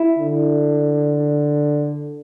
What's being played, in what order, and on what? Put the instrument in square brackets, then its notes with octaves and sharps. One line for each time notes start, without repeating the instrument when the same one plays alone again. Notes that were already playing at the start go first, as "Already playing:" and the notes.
Already playing: [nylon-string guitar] E4
[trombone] D3